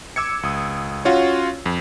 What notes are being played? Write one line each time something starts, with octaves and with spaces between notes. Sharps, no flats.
D6 E6 G#6 C#7
C#2 D#6
C#4 F4 F#4 C#5
F2